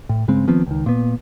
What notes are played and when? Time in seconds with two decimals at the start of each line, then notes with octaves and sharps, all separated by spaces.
0.09 A2
0.28 G2 C#3 G#3 C4
0.47 D#3 F3 B3 C4
0.66 C#2 D#3
0.86 A#2 B3